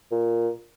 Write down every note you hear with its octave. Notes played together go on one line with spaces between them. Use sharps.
A#2